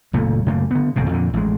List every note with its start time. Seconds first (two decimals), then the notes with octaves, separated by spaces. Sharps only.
0.13 F#1 D2 A#2 A3
0.47 F#2 C#3 A3 A#3
0.71 D3 B3
0.96 D1 C2 F2 B2
1.09 F2 A#2 D3
1.34 A1 G#3